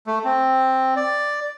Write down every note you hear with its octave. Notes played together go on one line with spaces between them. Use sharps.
A3
C4
D5